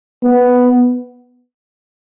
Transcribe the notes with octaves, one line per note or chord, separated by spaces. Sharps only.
B3